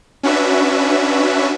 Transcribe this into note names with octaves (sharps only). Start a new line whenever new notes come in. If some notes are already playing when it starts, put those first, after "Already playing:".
C#4 D4 F#4 B4 E5